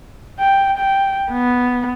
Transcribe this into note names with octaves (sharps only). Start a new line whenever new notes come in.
G5
G5
B3